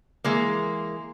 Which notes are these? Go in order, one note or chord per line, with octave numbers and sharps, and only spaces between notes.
E3 G#3 A#3